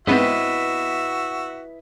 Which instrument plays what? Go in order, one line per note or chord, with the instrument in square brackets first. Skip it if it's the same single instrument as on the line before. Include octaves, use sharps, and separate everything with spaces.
[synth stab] G#2 B3 C4 [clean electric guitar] E4 B4 D#5 [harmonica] F#4 E5